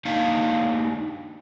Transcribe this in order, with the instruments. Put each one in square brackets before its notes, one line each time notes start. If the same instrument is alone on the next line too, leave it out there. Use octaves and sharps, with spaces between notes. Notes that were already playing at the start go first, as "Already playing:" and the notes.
[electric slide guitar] A#3 D4 D#4 F5